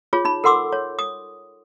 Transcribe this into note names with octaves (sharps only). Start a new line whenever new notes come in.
F4 G#4 C#5
D#4 B5
A4 A#4 F#5 C6 D6 E6
C#5
D#6